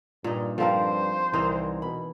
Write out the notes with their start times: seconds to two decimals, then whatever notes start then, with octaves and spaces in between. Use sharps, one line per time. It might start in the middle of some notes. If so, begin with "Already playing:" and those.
0.24 G2 A#2 D#4
0.58 G2 F3 C4 A4 A#4 C5 F5
1.33 C2 E3 D#4 A#4
1.82 B2 B5